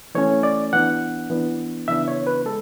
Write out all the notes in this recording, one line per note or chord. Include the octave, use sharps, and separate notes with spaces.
E3 A3 C#4 C#5
D5
E3 B3 D4 F#5
E3 B3 D4
C#3 E3 B3 D4 E5
C#5
B4
G#3 A4